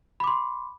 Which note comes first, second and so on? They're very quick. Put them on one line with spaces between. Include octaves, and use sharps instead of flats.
B5 D6 C6